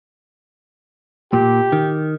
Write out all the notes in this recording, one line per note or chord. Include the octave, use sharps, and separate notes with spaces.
A#2 G4
D#3